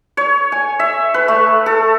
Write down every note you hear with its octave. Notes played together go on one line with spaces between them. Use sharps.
C#5
G#5
E5
B4
A3
A4